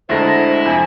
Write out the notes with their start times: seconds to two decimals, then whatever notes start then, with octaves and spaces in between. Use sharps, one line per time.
0.09 D2 D3 G#3 E4 C5 A5 A#5
0.65 F2 C3 G#5